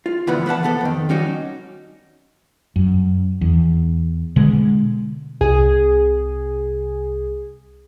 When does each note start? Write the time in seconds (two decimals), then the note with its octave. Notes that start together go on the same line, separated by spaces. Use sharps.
0.06 F4
0.27 D2 A#2 E3 F3 B3 B5
0.46 E3 B4 F#5 A5
0.63 C3 B3 A4
0.81 F2 D#3
1.09 G3 C#4 D#4 F#4
2.76 F#2
3.41 E2
4.36 B2 D3 G#3
5.41 C2 G#4